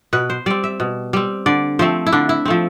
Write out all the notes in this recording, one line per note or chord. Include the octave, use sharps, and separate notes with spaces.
B2 B4
C5
G3 C4 D5
E5
B2
G3 C4
D3 D5
F3 A3 C4 C5
E4
D3 D4
E4
F3 A3 C4